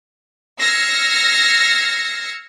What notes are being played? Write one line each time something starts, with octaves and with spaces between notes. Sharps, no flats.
E6 F6 G#6 A#6 C7 C#7